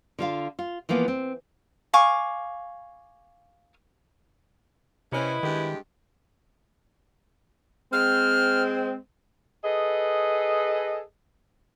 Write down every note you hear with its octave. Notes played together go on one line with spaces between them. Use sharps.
D3 F4 F5
F4
E3 F3 A#3 B3
C4
F5 G#5 C#6 D6
C3 C4 C#4 E4 B4 D#5
G2 D#3 G#3 G4
G#3 C4 F6
G#4 A4 B4 D#5